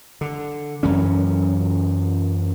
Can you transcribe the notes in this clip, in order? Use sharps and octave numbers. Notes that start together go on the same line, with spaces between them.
D3
F#2 E3 C#4